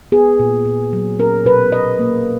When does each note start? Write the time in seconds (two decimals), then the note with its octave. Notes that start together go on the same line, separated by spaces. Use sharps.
0.12 B3 G#4
0.39 A#2
0.65 A#2
0.93 F#3
1.19 C#4 A#4
1.45 B2 B4
1.72 B2 D#5
1.99 A#3